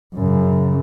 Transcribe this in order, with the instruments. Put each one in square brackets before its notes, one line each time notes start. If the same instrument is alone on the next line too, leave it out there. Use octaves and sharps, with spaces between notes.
[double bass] F#2 C#3